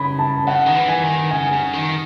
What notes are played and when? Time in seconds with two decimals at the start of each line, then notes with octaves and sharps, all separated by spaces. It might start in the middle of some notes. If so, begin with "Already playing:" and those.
Already playing: C#3 B5
0.19 A5
0.47 C#3 F#5
0.66 D#3
0.75 E3
0.88 G#5
1.03 D#3
1.30 C#3 G#5
1.52 C#3
1.73 D#3